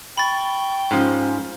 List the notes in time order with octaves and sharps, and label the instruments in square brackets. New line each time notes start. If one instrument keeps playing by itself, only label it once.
[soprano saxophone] G5 [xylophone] B5 A6 [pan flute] C#6
[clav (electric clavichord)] G#2 F3 [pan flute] C#4